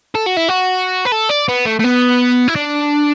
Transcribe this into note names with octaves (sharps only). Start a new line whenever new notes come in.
A4
F#4
E4
F#4
B4
A4
D5
B3
A3
A3
B3
E4
D4